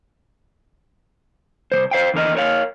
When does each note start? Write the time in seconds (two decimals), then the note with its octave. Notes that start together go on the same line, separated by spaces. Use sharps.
1.72 C2 E3 C5
1.91 C5 F5 G5
2.14 E2 D3 A#4 D#5
2.35 A#4 C#5 F5